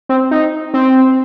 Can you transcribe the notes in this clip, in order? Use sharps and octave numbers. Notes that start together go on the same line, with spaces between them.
C4
D#4
C4